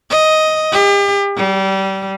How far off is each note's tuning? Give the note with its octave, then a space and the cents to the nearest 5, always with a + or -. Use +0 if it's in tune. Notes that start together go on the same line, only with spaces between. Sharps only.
D#5 +10
G4 +40
G3 -25